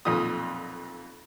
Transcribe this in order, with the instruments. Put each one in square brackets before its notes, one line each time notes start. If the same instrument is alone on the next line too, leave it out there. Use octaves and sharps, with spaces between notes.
[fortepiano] B1 F2 A#2 F4 D#6